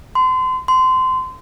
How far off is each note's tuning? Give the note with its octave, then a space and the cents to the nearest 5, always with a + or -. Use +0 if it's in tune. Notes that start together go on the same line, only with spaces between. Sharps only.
C6 -35
C6 -25